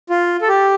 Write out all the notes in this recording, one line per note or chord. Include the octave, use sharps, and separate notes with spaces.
F4
A4
G4